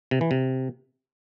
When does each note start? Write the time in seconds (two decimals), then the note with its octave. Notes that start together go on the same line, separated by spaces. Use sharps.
0.11 C3
0.21 E3
0.31 C3